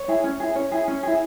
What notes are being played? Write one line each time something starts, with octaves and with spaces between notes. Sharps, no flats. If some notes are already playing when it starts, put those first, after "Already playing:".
Already playing: C#5
E4 G#4
C#4
E4 G#4
C#4 C#5
E4 G#4
C#4
E4 G#4